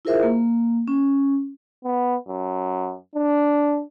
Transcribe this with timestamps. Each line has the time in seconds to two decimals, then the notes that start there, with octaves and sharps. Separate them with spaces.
0.05 E4 F4 G#4 A#4 C5 E5
0.23 A#3
0.88 C#4
1.84 B3
2.28 F#2
3.16 D4